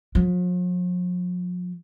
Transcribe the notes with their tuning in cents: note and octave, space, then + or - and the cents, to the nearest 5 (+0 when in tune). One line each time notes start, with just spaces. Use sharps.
F3 +45